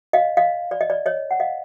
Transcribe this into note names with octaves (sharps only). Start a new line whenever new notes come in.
D#5 F5
D#5 F5
D5
D#5
D5
C#5 D#5
F#5
D#5 F5